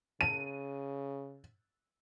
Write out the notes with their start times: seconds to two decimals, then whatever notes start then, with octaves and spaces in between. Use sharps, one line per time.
0.21 C#3 D#7